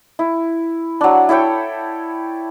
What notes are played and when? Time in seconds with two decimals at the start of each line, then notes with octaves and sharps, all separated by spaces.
0.19 E4
1.01 F#3 D4
1.29 E4 A4 C#5 G5